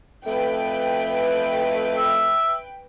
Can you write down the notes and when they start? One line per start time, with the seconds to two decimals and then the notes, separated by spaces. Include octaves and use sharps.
0.25 F2 A3 B4 G5
1.98 E5